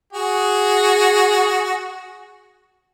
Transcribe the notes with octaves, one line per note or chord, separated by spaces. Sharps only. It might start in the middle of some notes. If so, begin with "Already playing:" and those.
F#4 G#4